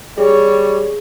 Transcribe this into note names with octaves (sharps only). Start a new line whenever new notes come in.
G3 G4 G#4 C#5